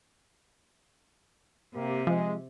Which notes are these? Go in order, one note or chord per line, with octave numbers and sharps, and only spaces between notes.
C3 A#3 G4
F3 G#3